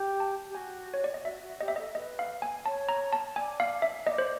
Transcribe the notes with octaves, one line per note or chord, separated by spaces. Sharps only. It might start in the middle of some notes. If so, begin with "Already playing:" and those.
Already playing: G4
A5
G4
F#4 G#5
C#5
D5
D#5
F#4 E5
F#4
G4 D#5
E5
A4 D#5
B4 D#5
F5
G#5
C#5 A5
A#5
A5
D5 G#5
F5
E5
D5 D#5
C5